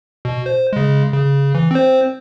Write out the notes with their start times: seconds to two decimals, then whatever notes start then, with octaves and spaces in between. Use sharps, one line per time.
0.25 B2
0.46 C5
0.73 C#3 G#3
1.13 C#3
1.55 E3
1.71 C4 C5